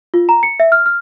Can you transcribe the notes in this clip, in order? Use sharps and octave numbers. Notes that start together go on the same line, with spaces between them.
F4
A#5
C#7
E5
F6
F6